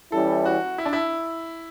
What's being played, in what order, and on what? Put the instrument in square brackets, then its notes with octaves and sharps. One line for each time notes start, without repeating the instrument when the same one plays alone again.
[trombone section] E3 G3 C#4 E4 [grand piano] A4
[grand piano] F#4
E4
D4
E4